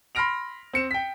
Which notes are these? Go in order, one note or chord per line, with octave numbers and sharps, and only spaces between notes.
B5 C6 F6 A#6 D7 F7
C4 C#7 E7
G5 B6